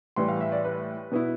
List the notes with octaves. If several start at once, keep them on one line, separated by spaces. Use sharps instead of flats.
A2 E3 G3 C6
F5
E5
D5
B4
B2 B3 E4